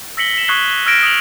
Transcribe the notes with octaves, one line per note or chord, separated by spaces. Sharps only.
E6 A#6 B6 C#7 F#7 G7
B6 E7
C#6 D#6 F#6 G#6 C7 G7
E6 F6 G#6 A#6 D7 E7
D#6 F6 D7 F7 F#7